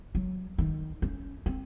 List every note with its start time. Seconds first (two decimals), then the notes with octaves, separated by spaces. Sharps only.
0.15 F#3
0.58 D#3
1.02 C#4
1.46 C4